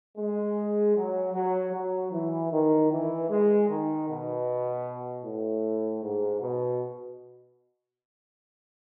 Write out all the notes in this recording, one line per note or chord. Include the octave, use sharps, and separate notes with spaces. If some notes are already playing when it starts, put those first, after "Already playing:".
G#3
F#3
F#3
F#3
E3
D#3
E3
G#3
D#3
B2
A2
G#2
B2